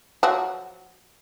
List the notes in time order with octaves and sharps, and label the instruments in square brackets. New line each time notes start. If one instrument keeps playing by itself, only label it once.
[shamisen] F3 F#3 F#4